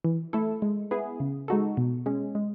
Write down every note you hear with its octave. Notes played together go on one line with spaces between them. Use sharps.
E3
A3 E4 A4
G#3
B3 E4 G#4
C#3
G#3 D#4 F#4 A4
B2
G#3 C#4
G#3